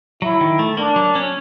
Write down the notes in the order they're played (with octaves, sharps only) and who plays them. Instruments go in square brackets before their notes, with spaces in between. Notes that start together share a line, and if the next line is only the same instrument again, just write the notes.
[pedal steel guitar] F#3 [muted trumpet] E4
[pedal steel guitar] D#3
A3
[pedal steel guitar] A#3 [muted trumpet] D4
[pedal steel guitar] F#3
C#4